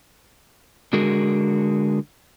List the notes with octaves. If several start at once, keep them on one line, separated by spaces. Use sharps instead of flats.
D3 G#3 F#4 G#4 A#4